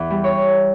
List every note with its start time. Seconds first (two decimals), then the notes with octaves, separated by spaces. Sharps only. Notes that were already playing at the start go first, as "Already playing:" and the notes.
Already playing: E2 E3
0.10 G3
0.24 C#5